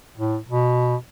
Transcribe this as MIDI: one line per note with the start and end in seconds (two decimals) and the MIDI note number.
0.17 0.37 45
0.49 0.96 47